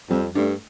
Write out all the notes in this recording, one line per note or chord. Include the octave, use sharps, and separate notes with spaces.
F2 G3 C4
G2 A3 D4